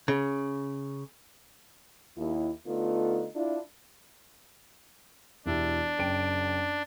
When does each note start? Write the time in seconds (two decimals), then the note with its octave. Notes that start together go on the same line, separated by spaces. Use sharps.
0.08 C#3
2.16 D#2 E4
2.66 D3 A3 B3 D#4 F4
3.34 D4 E4 F4
5.46 E1 D4 E4 G4
5.98 F#1 G5 D7